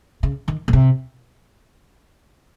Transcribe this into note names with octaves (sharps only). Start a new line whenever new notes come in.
C#3
D#3
A#2
C3